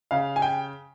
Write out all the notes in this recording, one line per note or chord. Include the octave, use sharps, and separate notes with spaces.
C#3 F5
G#5
G5